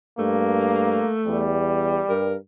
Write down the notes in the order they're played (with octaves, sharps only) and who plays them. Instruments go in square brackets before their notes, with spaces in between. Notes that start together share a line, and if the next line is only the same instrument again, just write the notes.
[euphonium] G2 [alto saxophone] A3 [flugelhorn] A#3
[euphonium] E2 [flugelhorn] G3
[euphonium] G2 [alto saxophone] A#4